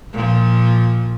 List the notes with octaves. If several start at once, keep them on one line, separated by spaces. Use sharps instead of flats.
A#2 F3